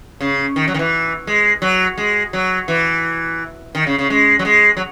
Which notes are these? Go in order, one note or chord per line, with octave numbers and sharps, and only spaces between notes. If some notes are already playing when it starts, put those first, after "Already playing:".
C#3
D#3
F#3
D#3
E3
G#3
F#3
G#3
F#3
E3
D#3
C#3
C#3
G#3
F#3
G#3
F#3